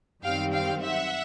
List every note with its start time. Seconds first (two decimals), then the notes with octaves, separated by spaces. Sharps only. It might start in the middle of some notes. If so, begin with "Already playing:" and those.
0.23 F#2 D#3 G3 C4 F5 G5
0.53 F5 G5
0.82 E5 F#5